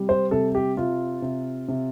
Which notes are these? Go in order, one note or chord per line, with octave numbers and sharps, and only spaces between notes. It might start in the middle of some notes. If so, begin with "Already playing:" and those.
Already playing: C3 G3
C5
C3 A4
G4
C3 F4
C3
C3